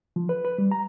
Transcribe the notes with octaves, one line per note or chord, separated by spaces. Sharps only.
F3
B4
B4
G3
A#5